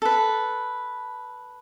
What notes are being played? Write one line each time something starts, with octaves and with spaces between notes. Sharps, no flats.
A4 B4